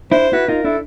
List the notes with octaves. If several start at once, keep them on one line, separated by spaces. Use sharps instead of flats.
D4 E4 C5
E4 F#4 B4
D#4 F4 A#4
D4 E4 A4